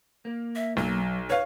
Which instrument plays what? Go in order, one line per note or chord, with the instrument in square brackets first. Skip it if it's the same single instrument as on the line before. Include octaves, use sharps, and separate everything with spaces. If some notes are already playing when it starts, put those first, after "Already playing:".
[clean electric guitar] A#3
[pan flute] E5
[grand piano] B1 [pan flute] F#3
[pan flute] B4 [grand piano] C#5 F5